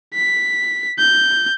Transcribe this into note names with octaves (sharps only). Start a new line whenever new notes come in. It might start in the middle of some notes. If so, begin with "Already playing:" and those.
B6
G6